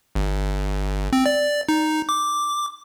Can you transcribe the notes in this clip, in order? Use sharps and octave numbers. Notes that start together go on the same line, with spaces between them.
G1
C4
D5
D#4
D6